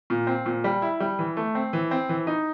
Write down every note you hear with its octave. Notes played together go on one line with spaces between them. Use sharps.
A#2
C4
A#2
G3
E4
G3
E3
A3
C4
E3
C4
E3
D#4